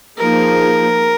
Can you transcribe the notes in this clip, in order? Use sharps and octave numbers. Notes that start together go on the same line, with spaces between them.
F3 A#3 D#4 G#4 A#4